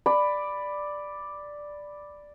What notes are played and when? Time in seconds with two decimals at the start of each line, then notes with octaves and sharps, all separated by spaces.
0.06 D5 B5